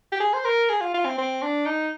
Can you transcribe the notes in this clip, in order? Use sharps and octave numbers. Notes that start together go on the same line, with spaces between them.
G4
G#4
C5
A#4
G#4
F4
F4
C4
C4
D4
D#4